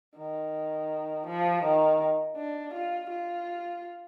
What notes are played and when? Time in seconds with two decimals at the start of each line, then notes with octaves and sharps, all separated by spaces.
0.18 D#3
1.27 F3
1.63 D#3
2.37 D4
2.74 F4
3.10 F4